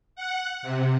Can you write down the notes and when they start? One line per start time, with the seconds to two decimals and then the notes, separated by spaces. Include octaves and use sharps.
0.16 F#5
0.62 C3